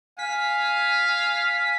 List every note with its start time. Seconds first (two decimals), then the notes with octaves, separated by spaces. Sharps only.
0.19 F5 G#5 B6